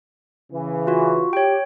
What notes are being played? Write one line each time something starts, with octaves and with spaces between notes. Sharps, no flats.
C#3 E3
F4 F#4
G4 C#5 G5